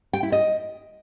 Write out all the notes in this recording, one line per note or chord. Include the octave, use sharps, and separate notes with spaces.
G5
E4
D#5